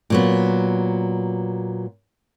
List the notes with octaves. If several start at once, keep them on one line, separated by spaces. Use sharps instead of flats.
A#2 F#3 B3